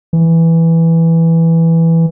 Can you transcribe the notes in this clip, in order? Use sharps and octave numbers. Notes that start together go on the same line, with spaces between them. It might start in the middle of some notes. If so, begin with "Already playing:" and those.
E3